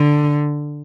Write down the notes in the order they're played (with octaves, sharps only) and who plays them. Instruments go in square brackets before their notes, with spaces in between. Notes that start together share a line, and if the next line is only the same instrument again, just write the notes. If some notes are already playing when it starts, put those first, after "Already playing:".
Already playing: [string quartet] D3